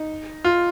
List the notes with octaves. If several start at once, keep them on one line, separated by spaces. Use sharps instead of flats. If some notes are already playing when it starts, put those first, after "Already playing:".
Already playing: D#4
F4